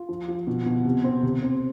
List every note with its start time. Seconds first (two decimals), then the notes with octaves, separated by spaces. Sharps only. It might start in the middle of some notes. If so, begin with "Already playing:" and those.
Already playing: F4
0.09 F3
0.28 F3
0.47 B2
0.66 B2
0.85 C3
1.04 C4
1.23 C3
1.43 C4